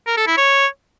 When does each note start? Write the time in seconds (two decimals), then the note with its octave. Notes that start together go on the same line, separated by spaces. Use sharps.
0.07 A#4
0.17 A4
0.27 E4
0.37 C#5